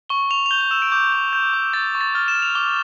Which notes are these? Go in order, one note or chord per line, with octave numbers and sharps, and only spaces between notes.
C#6 G7
C#6 F7
F7
G6 G7
F7
E6 E7
D7
D6 G6
G6
G6
D6
C#6 A6
C#6
A6
F6 A6
E7
F6
F7
D6 G7